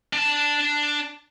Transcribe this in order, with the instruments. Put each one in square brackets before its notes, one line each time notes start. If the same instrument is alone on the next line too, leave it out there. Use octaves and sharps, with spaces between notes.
[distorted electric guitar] D4 A5